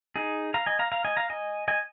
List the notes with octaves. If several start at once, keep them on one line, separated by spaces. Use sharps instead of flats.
D#4 G#4
F5 A#5
D#5 G#5
F5 A#5
F5 A#5
D#5 G#5
F5 A#5
D#5 G#5
D#5 G#5